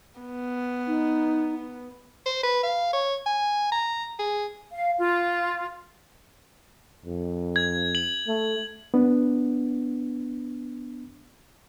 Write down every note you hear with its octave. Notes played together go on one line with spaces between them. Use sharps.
B3
D#4
C5
B4
F5
C#5
G#5
A#5
G#4
F5
F4
F2
G#6
F#7
A3
B3 D4